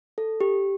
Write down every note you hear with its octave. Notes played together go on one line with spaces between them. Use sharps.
A4
G4